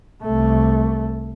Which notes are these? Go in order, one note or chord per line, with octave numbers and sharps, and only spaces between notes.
C2 A3